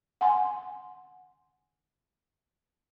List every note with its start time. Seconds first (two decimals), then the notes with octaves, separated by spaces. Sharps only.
0.21 F#5 G#5 C6